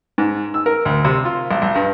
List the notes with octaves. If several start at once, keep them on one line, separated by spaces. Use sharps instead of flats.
G#2
E6
A#4
D2
C3
F4
B1
B1
G2